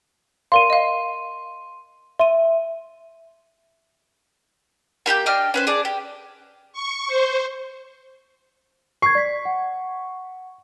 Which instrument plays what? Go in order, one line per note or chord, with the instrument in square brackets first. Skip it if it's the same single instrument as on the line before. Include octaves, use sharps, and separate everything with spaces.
[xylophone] A#4 D5 F5 [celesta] C6 D#7
[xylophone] D#5 F5
[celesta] E5 [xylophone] C6 D#7
[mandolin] A#3 G4 B5 G6
D4 D#5 G5 F6
C#4 B4 C5
G#4 D5 A5
G4
[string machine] C#6
C5
[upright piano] C#6 [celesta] G#6 C7
[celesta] D5 B6
F#5